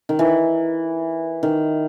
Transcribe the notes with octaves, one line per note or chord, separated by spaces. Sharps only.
D#3
E3
D#3